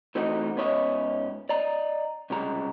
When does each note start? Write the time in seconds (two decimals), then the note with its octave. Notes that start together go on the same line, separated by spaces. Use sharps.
0.15 E3 A3 C4 D#4 F#4 D#5
0.56 G#2 B3 C#4 C#5 D#5 E5
1.49 D5 D#5 A#5
2.30 C2 C#3 G#3 A#5